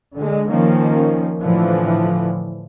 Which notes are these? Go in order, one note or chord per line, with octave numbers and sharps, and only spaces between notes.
D3 G#3
D#3 F3 A#3 C#4
A2 D3 E3 F3